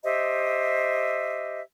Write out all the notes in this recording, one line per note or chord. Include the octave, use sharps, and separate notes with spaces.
G4 C5 D#5 E5